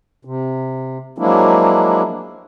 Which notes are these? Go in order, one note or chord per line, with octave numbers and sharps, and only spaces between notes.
C3
F3 F#3 G#3 A#3 D4 E4